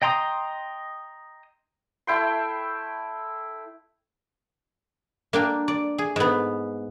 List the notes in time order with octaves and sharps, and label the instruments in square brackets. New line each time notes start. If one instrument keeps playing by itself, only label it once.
[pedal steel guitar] D#5 G5 A#5 C6 D#6
[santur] A3 E4 G5 C6
[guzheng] A#3 D4 G5
D5
G#4
G#2 B3